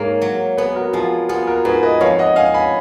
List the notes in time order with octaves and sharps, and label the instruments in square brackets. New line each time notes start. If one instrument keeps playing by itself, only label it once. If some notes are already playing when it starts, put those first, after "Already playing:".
Already playing: [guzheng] G#2 A#3 [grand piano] A#4 C#5
[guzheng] F#3
[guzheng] B3 [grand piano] G#4 B4
[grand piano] F#4 A#4
F#4
[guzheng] F3 [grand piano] F4 G#4
[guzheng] B3 [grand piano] F4 G#4
[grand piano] F#4 A#4
[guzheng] G#2 [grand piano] G#4 B4
[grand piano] B4 D#5
[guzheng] F2 [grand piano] C#5 F5
[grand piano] D#5 F#5
[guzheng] C#4 [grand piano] F5 G#5
[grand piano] G#5 B5